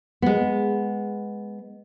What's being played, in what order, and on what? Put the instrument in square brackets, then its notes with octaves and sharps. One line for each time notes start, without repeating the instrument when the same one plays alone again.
[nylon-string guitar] G#3 B3